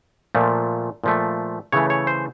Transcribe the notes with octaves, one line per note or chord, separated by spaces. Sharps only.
A#2 F3 A3
A#2 F3 A3
C#3 E3 A3 C#5
C#5
C5